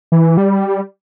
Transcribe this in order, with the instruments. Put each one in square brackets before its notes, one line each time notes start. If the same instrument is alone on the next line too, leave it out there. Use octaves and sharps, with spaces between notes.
[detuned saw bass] E3
G3